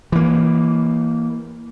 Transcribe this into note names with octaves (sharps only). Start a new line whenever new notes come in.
E3 A#3